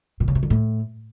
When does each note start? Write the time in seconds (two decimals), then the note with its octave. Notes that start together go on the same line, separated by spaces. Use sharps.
0.20 B2
0.28 C#3
0.35 C3
0.43 D3
0.50 A2